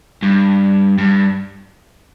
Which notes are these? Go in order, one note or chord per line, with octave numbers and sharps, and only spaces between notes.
G2
G2